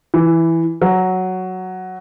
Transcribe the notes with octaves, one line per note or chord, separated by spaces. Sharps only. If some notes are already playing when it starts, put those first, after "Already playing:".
E3
F#3